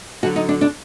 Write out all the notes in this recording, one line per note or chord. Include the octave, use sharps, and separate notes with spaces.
D3 F#3 F#4
D#4
D4
D4